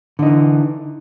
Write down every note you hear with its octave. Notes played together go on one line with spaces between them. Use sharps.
D3 E3 D#4